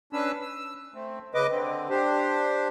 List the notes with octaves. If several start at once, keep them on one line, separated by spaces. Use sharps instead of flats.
C#4 D4 B4 E6
E6
A3 C4
C#3 B4 D#5 D6
D3 C4
D4 G4 C5